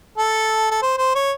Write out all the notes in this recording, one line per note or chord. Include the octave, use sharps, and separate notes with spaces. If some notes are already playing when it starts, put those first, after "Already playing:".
A4
A4
C5
C5
C#5